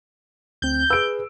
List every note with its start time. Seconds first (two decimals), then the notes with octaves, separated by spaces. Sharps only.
0.62 D2 C4 G6
0.90 G#4 B4 E6 D7